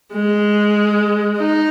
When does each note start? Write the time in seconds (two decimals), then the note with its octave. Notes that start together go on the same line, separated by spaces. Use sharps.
0.13 G#3
1.37 D#4